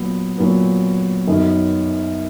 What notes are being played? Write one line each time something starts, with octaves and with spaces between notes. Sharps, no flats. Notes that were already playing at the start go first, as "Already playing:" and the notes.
Already playing: A#2 F#3 B3
A#2 F#3 B3
F#2 D#3 F#3 B3